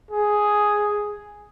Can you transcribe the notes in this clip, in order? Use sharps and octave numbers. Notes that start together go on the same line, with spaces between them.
G#4